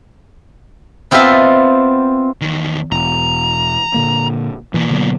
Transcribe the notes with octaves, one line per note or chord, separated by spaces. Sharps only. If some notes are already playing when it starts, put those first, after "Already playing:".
B3 C4 F4 D#5 E5 A5
E2 D#3
E1 A#5
A#2 D3 A#3
B2 E3 A#3
D3 F#3 B3